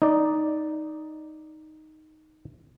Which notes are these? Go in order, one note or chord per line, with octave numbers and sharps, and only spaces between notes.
D#4 D5